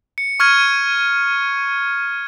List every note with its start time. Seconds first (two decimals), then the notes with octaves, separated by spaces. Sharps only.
0.18 C#7
0.40 C#6 F6 G#6 D#7